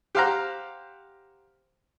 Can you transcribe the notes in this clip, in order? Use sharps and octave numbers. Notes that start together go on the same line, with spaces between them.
G4 C5 F5 F#5 A#5